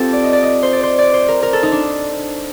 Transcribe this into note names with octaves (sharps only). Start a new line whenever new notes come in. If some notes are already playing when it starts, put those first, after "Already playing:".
Already playing: C4 F4 G4 A4
D5
D#5
D5
D#5
C5
D5
C5
D5
C5
A#4
A#4
A4
D#4
D4